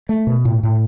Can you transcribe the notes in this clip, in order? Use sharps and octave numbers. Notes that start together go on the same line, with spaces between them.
A3
B2
A2
A2